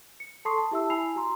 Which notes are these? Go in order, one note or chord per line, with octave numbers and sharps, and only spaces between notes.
C#7
A4 A5 C6 C#6 D#6 C7
A5
E4 G4 E5 A5 E6
E4 G#5 B5 E6 C7 F7
F#4 A#5 C6